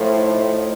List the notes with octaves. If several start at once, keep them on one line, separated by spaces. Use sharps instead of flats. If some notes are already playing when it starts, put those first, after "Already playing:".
Already playing: A2 F3 A3
D#4